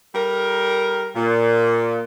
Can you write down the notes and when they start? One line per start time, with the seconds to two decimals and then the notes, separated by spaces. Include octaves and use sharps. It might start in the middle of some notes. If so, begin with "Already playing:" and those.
0.15 G3 A4 A#4
1.16 A#2